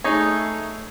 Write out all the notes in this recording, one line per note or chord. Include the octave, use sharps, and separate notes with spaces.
A3 D#4 G#4 C#5